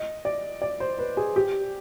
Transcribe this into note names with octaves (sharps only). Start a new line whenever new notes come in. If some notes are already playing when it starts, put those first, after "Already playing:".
Already playing: D#5
D5
D5
C5
B4
G#4
G4